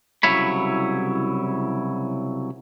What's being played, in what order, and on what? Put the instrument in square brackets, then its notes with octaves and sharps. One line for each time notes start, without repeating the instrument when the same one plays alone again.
[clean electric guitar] C2 C#3 F#3 E4 C#5 B5